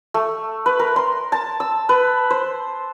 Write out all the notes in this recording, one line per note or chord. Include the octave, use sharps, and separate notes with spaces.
A3
B4
A#4
C6
A5
E6
B4
C5